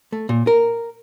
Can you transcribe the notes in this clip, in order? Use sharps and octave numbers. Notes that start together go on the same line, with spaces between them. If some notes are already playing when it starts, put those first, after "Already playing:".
A3
A#2
A#4